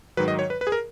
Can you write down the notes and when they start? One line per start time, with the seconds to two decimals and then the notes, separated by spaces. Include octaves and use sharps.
0.17 G#2 D#3 F#3 B4
0.28 D#5
0.39 C#5
0.50 B4
0.61 B4
0.67 G#4
0.72 A#4